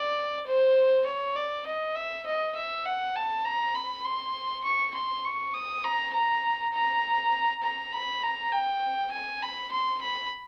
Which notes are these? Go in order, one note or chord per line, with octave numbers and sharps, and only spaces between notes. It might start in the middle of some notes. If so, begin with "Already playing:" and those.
Already playing: D5
C5
C#5
D5
D#5
E5
D#5
E5
F#5
A5
A#5
B5
C6
C#6
C6
C#6
D#6
A#5
A#5
A#5
A#5
B5
A#5
G5
G#5
B5
C6
B5